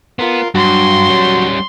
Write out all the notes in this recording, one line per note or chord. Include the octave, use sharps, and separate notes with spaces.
B3 F4 A#4 C6
G2 F#3 F#4 C6
G3 C#4